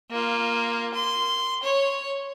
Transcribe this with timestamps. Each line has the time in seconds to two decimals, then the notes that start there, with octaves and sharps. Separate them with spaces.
0.11 A#3 F4
0.94 C6
1.63 C#5